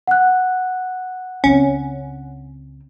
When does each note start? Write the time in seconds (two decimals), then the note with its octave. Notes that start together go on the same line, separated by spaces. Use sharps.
0.07 F#5 F#6
1.44 C#2 C4 C#4